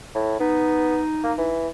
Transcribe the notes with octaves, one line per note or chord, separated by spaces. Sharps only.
A2
B3 D#4
A#3
E3